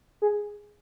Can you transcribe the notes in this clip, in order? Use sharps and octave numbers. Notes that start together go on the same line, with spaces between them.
G#4